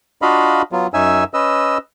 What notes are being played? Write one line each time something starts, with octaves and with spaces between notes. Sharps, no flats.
D4 F4 F#4 D#5 F5 B5
F#3 B3 F4
F#2 C#4 D#4 E5 G#5 E6
C#4 B4 D#5 E6